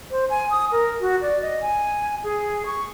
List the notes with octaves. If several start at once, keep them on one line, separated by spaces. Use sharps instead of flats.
C5
G#5
D#6
A#4
F#4
D5
D#5
G#5
G#4
C#6